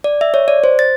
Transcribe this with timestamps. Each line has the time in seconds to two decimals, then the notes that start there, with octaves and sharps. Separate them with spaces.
0.04 D5
0.21 E5
0.34 C#5
0.48 D5
0.64 C5
0.79 A6